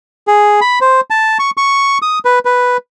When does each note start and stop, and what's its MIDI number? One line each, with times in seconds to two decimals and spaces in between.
0.27 0.60 68
0.61 0.79 83
0.81 1.01 72
1.10 1.38 81
1.39 1.50 85
1.57 1.98 85
2.02 2.19 87
2.25 2.39 71
2.45 2.77 71